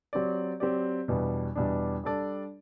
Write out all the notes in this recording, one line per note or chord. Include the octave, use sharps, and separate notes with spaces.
F#3 C4 G4 D5
F#3 C4 G4 D5
E2 B2 G3 D4
E2 B2 G3 D4
G3 D4 A4 D5